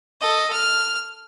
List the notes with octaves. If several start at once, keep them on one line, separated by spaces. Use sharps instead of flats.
A4 D#5
F6